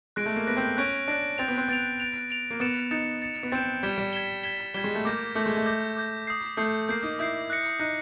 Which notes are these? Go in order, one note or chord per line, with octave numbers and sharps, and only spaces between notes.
G#3 F#6 A#6 D7
A3
A#3
B3 F#6 A#6 D7
C4
C#4 F#6 A#6 D7
D4 F#6 A#6 D7
C4 A6 D7 F7
B3
C4
B3 A6 D7 F7
A6 D7 F7
A6 D7 F7
A#3
B3 A6 C#7 E7
D#4 A6 C#7 E7
A6 C#7 E7
B3
C4 A6 C#7 E7
G3 G#6 B6 E7 G7
G3
G#6 B6 E7 G7
G#6 B6 E7 G7
G3 G#6 B6 E7 G7
G#3
A3
A#3 D6 G6 A#6
A3 D6 G6 A#6
G#3
A3
D6 G6 A#6
D6 G6 A#6
D#6 G6 C7
A3 D#6 G6 C7
A#3 D#6 G6 C7
D#4
E4 D#6 G6 C7
F#6 A#6 C#7
D#4 F#6 A#6 C#7